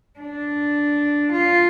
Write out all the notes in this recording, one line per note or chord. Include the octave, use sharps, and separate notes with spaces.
D4
F4